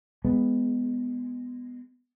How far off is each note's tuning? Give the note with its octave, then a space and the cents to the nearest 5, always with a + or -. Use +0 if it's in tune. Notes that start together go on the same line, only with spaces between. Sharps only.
G#3 -10 B3 +5